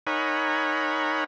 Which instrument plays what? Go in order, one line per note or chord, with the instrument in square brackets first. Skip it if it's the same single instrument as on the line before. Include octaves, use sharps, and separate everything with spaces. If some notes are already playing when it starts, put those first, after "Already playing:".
[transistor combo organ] D#4 A#4 C#5 F#5 G#5 B5